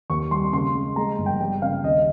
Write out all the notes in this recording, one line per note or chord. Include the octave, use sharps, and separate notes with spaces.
D#2 C#6
G3 C6
C#3 C6
G#3
G#3 A#5
G1
G5
G3 G5
C#3 F5
D#2 D#5